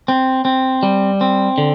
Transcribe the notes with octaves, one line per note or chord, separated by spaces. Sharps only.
C4
C4
G3
C4
D3